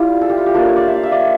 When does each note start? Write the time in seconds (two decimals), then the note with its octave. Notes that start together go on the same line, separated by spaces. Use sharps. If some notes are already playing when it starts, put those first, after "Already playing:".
Already playing: G3 E4 F4 G4
0.21 A4
0.30 G4
0.38 F4
0.46 G4
0.54 A#3 D4 F4 A4
0.65 C#5
0.76 D5
0.87 E5
0.96 F5
1.03 E5
1.12 D5
1.20 C#5